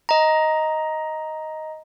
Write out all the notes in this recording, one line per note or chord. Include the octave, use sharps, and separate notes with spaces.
D#5 A#5